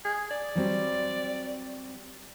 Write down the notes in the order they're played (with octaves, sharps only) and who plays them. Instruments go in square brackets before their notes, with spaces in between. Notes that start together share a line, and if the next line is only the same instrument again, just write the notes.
[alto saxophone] G#4
D5
[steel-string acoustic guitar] F#3 G3 C4